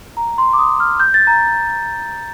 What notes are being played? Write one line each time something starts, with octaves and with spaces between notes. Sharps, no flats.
A#5
C6
D6
D#6
F6
G6
A6
A#5